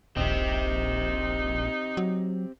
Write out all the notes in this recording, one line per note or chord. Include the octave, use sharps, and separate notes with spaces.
D#1 A#1 C4 D#4 G4
F#3